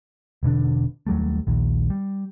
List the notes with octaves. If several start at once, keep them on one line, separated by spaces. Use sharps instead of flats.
E1 B2 D3 D4
D#2 F#3 G3 A3
A#1 D#2
G3